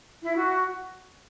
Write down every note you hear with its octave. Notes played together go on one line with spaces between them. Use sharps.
E4
F#4